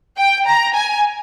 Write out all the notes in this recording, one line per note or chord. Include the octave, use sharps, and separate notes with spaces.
G5
A#5
G#5